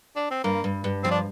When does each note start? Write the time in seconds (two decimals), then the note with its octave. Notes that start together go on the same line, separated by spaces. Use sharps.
0.16 D4
0.31 C4
0.44 G2 A#3
0.64 G2
0.84 G2
1.04 F3 C4
1.11 D4